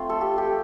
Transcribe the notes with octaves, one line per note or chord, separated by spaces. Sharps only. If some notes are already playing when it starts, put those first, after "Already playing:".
Already playing: A3 C4 F4
A4
G4
G4